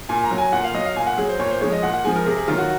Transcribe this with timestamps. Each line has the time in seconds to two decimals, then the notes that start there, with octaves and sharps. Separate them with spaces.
0.09 A#2 G#5
0.24 A#5
0.31 F#3
0.38 G#5
0.53 A#2 F#5
0.64 F5
0.74 F#3 D#5
0.85 F5
0.96 A#2 G#5
1.07 F#5
1.18 F#3 G#4
1.29 C5
1.39 A#2 C#5
1.51 C5
1.61 F3 G#3 C#5
1.72 D#5
1.83 A#2 F#5
1.94 F#5
2.05 F3 G#3 G#5
2.16 A#4
2.26 C3 G#4
2.37 G#4
2.48 D#3 F#3 F4
2.58 F#4